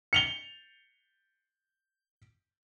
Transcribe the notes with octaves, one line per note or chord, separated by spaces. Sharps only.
C#7 F7 G7